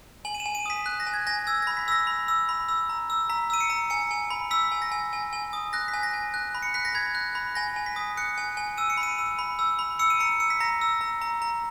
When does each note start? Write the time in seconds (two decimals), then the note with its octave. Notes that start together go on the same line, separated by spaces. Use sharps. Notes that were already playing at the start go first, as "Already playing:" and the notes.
0.25 G#5 F#7
0.35 D#7
0.40 E7
0.46 G#5
0.55 D#7
0.66 D#6 B6
0.86 F#6 B6
1.00 A#6
1.07 G#5
1.14 G#6
1.27 G#5 A#6
1.47 E6 G#6
1.62 B5 A#6
1.77 B6
1.88 E6 A#6
2.07 B5
2.28 E6
2.49 B5
2.68 E6
2.89 A#5
3.10 E6
3.30 A#5 B6
3.50 E6 D#7
3.61 C#7
3.70 A#5
3.90 G#5 C#7
4.11 G#5
4.30 B5
4.51 E6 B6
4.72 G#5
4.82 A#6
4.92 G#5
5.13 G#5
5.33 G#5
5.53 D#6
5.73 F#6 A#6
5.88 B6
5.94 G#5
6.03 A#6
6.14 G#5
6.34 F#6
6.55 B5
6.62 C#7
6.74 F#6 B6
6.85 A#6
6.95 B5 G#6
7.15 F#6
7.35 B5
7.55 G#5 A#6
7.76 G#5
7.86 B6
7.96 D#6
8.17 F#6 C#7
8.38 G#5
8.57 G#5
8.78 E6 D#7
8.90 C#7
8.98 B5
9.03 D#7
9.18 E6
9.39 B5
9.59 E6
9.79 B5
9.99 E6 C#7
10.10 D#7
10.20 A#5 C#7
10.40 E6 C#7
10.50 B6
10.60 A#5 A#6
10.81 E6
11.01 A#5
11.21 A#5
11.42 A#5